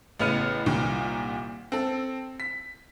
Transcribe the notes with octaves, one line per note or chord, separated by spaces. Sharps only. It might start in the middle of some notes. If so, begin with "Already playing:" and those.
A1 C#3 B3 F6 C#7 D#7
C2 A#2 D#3
C4 A4
B6